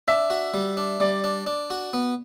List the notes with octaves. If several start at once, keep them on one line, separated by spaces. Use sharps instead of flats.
D4 E5
F#4
G3
D4
G3 D5
D4
D4
F#4
B3